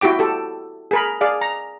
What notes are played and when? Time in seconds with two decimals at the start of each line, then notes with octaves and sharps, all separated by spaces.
0.01 E4 F#4 G4 G5 D6
0.19 G4 A4
0.91 G#4 A#4 B5
1.21 G#4 D5 F5
1.41 A#5